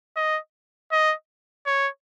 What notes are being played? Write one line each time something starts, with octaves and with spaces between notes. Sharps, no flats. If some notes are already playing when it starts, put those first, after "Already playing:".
D#5
D#5
C#5